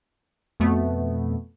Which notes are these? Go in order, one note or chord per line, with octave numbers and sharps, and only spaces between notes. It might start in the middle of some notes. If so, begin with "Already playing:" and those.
F2 B2 A3 B3